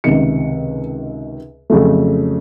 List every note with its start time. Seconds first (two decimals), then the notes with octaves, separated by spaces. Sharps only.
0.04 C#2 C3 D#3 C#7
1.70 F2 C#3 F#3 A3